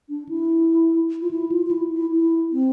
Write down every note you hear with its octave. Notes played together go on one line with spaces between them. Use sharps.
D4
E4
F4
E4
F4
F4
E4
E4
E4
C4